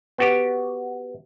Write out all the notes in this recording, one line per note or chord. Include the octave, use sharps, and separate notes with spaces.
B3 F#4 G4